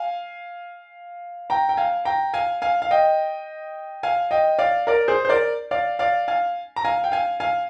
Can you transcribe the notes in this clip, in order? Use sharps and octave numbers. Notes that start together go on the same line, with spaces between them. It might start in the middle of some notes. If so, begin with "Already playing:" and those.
Already playing: F5 G#5
G5 A#5
G5
F5 G#5
G5 A#5
F5 G#5
F5 G#5
F5
D#5 G5
F5 G#5
D#5 G5
D5 F5
A#4 D5
G#4 C5
C5
A#4 D5
D5 F5
D5 F5
F5 G#5
A#5
F5 G#5
G5
F5 G#5
F5 G#5